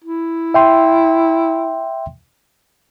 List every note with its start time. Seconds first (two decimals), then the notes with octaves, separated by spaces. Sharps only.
0.04 E4
0.54 E5 G5 C6